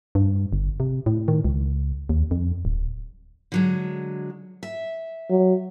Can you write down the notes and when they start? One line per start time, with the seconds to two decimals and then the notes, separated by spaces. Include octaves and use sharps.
0.15 G2
0.53 G1
0.80 C3
1.06 A2
1.28 D#3
1.45 C#2
2.09 D#2
2.31 F2
2.65 D1
3.52 D3 F#3 G#3
4.63 E5
5.30 F#3